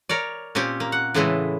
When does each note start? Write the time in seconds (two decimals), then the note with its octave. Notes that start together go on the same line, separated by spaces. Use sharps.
0.09 A#4 C#5 D5
0.55 A#2 C4 C#4 G4
0.80 A#3
0.92 F#5
1.14 A2 C#3 E3 G#3 A3 E4